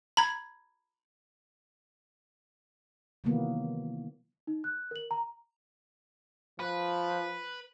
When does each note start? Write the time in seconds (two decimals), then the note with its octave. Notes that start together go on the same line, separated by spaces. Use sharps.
0.17 A#5 B5 G#6
3.24 C3 D#3 E3 F#3 A#3 B3
4.47 D#4
4.64 F#6
4.91 A#4 F#7
5.11 A#5
6.60 F3 B4